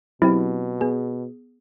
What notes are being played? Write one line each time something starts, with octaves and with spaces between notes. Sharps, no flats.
B2 F#3 C4 E4 G4
B3 G#4